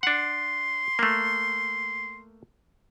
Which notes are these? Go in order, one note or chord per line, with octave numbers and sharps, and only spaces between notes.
D4 F#5 C6
A3 A#3